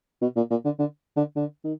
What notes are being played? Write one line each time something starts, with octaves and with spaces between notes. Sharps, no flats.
B2
A#2
A#2
D3
D3
D3
D3
D#3